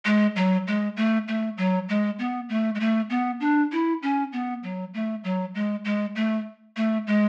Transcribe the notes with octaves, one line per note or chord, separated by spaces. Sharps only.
G#3
F#3
G#3
A3
A3
F#3
G#3
B3
A3
G#3
A3
B3
D4
E4
C#4
B3
F#3
A3
F#3
G#3
G#3
A3
A3
G#3